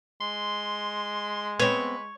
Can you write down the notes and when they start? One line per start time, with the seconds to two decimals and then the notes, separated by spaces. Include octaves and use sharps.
0.21 G#3 C6
1.59 B3 C4 B4 C#5